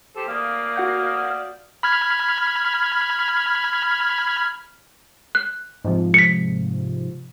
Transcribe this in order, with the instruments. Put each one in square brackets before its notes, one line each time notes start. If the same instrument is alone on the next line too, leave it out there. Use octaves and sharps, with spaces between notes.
[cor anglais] G4 [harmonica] A4 C5
[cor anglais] A#3 [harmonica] D5 F5 D#6
[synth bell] F#4 F#5 G6
[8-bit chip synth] B5 F6 G#6
[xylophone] F#6
[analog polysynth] G#2 C3 F3
[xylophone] B6 C#7